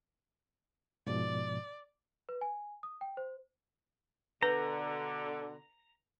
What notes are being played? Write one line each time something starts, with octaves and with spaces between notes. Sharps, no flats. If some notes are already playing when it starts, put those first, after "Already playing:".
G#2 B2 F3 D5
B4
G#5
D#6
G5
C5
B2 D3 B4 A#5